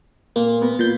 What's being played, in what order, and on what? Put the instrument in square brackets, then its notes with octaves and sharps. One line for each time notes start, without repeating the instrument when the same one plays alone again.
[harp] A#2 [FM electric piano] A#3
[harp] B3 A#4 B4
[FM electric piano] A#2 G6